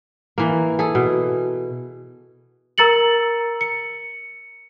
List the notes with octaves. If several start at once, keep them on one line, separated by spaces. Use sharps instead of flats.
E3 A#3
G#4 A4
B2
A#4 A#5 E6 A6 C#7 F#7
C#7